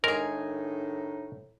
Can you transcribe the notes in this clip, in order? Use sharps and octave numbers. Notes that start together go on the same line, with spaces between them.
A2 D#3 G#3 D4 D#4 G#4 A#4